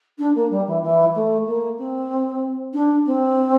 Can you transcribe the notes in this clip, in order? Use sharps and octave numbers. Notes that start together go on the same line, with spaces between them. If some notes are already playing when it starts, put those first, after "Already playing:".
D4
A#3
G3
E3
E3
A3
A#3
C4
D4
C4